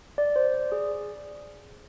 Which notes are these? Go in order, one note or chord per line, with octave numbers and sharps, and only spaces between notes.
D5
C5
D5
G#4